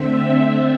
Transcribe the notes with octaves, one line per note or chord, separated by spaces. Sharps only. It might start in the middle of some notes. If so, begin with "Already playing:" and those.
Already playing: D3 A3 C4 E5